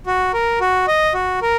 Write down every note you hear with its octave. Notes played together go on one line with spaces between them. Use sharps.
F#4
A#4
F#4
D#5
F#4
A#4